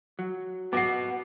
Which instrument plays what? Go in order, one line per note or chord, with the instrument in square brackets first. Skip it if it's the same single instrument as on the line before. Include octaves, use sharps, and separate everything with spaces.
[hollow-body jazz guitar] F#3
[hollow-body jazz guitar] B3 F#4 [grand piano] D6 C7